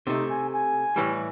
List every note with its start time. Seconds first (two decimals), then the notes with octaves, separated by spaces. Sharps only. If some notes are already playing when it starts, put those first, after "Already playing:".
0.07 C3 A3 D#4
0.29 G#5
0.53 G#5
0.96 A2 E3 G3